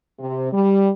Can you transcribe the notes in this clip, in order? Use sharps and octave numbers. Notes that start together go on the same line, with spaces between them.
C3
G3